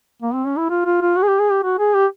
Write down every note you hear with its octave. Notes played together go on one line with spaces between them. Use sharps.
A#3
C4
C#4
E4
F4
F4
F4
F#4
G#4
G4
G#4
G4
F#4
G#4
G4